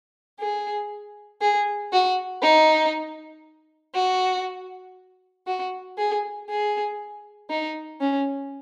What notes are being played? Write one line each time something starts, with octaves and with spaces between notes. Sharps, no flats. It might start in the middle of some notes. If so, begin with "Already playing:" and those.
G#4
G#4
F#4
D#4
F#4
F#4
G#4
G#4
D#4
C#4